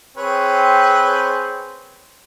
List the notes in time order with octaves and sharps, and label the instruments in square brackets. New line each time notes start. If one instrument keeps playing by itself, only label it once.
[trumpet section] C4 [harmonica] G#4 B4 C#5